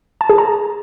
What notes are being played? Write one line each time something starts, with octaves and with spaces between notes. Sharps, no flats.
A5
G#4
A#5